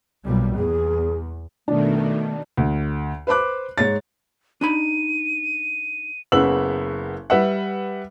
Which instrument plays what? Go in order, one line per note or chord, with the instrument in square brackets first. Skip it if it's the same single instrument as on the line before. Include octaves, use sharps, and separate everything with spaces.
[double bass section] B1 A#2 G3
[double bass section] E2 [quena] G#4
[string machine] B2 D#3 [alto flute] A3 [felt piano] D4
[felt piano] D2
B4 C5 B5 D6 F#6
G#2 C#5 A6
[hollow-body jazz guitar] D4 D#4 B5 [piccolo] D#7
[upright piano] F#1 C#3 B3 E6 F#7
G3 B4 E5 F#5